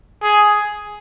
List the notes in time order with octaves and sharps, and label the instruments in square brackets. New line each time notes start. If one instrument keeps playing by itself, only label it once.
[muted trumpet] G#4